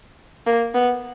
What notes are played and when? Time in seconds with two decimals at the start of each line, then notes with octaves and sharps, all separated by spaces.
0.46 A#3
0.74 B3